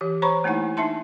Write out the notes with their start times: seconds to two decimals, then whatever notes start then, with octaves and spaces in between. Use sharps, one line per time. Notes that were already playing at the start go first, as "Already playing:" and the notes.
0.01 E3 G4
0.22 C5 C#5 A#5 B5 C#6
0.44 A3 A#3 D#4 E4 F#5
0.77 D4 D#4 E5 A5 C6